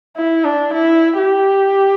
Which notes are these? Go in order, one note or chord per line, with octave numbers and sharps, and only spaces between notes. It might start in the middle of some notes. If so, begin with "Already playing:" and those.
E4
D4
E4
G4